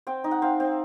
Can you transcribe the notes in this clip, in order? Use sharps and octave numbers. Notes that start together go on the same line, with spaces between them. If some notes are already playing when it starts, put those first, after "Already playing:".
C4 G5
D#4
F#5
C4 F5
C4